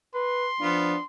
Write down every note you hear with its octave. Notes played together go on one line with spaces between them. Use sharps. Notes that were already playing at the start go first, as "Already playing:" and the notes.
B4 C6
F3 B3 D4 F4